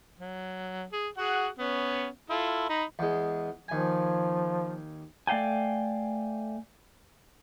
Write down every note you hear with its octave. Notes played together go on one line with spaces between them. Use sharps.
F#3
G#4
F#4 G#4 F#5
B3 C#4
E4 F4 A4
D#4 A#5 B5
E2 G#3
D#2 F3 G#5
A3 D5 F5 G5 G#5